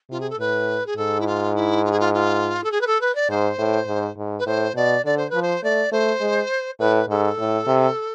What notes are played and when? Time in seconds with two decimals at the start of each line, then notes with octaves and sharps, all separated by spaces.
0.10 C3 F4
0.20 G#4
0.30 A4
0.39 A2 B4
0.86 G#4
0.97 G#2 A4
1.20 E4
1.26 F4
1.56 E4
1.85 F4
1.91 G#4
2.00 F4
2.14 F4
2.64 A4
2.71 G#4
2.81 B4
2.87 A4
3.01 B4
3.15 D5
3.30 G#2 C5
3.59 A2
3.88 G#2
4.17 G#2
4.39 B4
4.46 A2 C5
4.76 B2 D5
5.05 D3 D5
5.17 C5
5.30 F3 B4
5.42 C5
5.63 A3 D5
5.92 A3 C5
6.21 G#3
6.79 A2 B4
7.09 G#2 A4
7.39 A2
7.67 C3